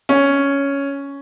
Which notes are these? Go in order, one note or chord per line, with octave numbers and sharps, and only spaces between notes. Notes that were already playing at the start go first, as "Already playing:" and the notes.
C#4